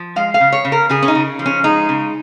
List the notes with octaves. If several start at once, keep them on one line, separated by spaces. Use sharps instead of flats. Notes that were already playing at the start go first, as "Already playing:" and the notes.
Already playing: F3
G#3 F5
F5
C#3
C#5
C#3
A#4
C#3 G#4
C#4
D#4
C#3
F3
C#4
G#3 D#4
C#3